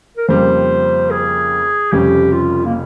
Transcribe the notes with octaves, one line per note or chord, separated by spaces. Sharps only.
A#4
F2 C#3 G3 A#3 C5
G#4
F1 F2 C#3 G3 C#4 G4
F4
A#3